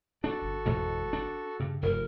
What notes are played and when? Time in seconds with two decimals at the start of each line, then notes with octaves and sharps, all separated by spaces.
0.24 D4 F#4 A4
0.42 G1
0.66 E2 G#2 B2
1.13 D4
1.60 G2 C#3
1.83 F1 G2 A#4